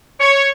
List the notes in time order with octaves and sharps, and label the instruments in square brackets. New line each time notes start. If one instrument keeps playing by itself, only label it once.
[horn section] C#5